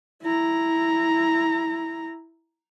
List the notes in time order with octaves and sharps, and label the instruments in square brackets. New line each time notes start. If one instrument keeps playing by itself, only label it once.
[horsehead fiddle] E4 A#5